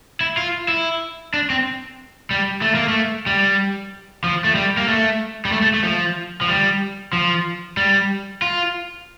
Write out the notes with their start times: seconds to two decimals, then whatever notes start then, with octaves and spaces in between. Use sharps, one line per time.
0.21 E4
0.37 F4
0.68 E4
1.34 D4
1.50 C4
2.31 G3
2.62 A3
2.75 A#3
2.88 A3
3.27 G3
4.24 F3
4.44 A3
4.55 G3
4.77 A#3
4.88 A3
5.45 G3
5.52 A3
5.62 A3
5.74 A3
5.84 F3
6.41 F3
6.48 G3
7.13 F3
7.77 G3
8.42 F4